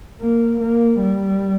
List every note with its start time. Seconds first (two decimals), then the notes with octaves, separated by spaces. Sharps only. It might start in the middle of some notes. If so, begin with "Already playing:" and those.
0.21 A#3
0.61 A#3
1.00 G3